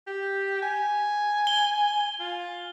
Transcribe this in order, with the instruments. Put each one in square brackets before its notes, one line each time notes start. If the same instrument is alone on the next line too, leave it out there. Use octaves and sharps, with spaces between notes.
[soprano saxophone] G4
G#5
[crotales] G7
[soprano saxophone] F4